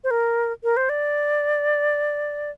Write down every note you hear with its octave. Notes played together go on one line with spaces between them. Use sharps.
C5
A#4
A#4
C5
D5